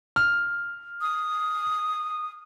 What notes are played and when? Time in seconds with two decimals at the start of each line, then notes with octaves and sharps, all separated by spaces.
0.16 F6
1.01 D#6